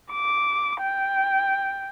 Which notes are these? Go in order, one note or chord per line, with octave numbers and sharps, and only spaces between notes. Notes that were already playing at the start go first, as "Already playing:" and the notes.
D6
G5